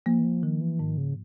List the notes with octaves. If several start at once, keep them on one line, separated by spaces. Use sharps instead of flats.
F3 A#3
E3
F3
D#3 F3
E3
G#2 D#3
C#3